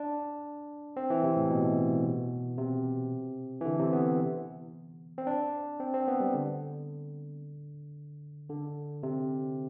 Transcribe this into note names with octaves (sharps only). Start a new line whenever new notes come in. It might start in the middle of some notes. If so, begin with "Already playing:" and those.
Already playing: D4
C4
E3
C3
A2
B2
C3
E3
D3
C3
B3
C4
D4
C4
C4
B3
G3
D3
D3
C3